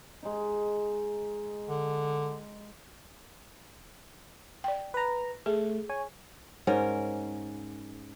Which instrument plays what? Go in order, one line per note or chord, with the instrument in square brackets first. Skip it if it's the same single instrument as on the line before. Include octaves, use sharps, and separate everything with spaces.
[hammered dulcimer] G#3 D#4
[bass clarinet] D3
[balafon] D5 G5
[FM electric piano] B4 A#5
[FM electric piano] A3 [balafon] G#4
[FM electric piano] C#5 G#5
[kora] G#2 C#4 A#4